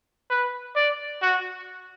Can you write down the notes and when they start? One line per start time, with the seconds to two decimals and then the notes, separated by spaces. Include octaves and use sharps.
0.30 B4
0.76 D5
1.22 F#4